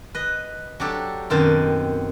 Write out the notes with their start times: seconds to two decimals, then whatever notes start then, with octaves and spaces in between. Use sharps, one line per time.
0.15 B4 D#5
0.80 F#3 D4 G4 A4
1.30 F#2 B2 D#3 C4 G4 A5